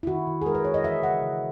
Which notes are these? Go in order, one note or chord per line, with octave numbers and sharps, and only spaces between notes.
E4
D#3 F#4
D#3
G#4
G#3 A#4
B4
D#3 C#5
D#5
E3 E5
C#3 F#5
C#3